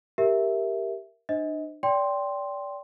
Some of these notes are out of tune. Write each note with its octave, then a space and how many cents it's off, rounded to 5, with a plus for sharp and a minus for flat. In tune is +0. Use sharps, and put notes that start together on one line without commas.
G4 +0 A#4 +0 E5 +0
D4 +40 C5 +0 D#5 +30
D5 -30 G5 +0 C6 +0